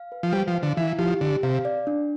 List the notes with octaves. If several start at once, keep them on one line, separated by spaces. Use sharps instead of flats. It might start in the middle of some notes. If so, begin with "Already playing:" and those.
Already playing: F5
B4
F3
G3 C5
F3
F5
D3
E3 E4
F3 G4
D3 G4
C3 F5
D5
D4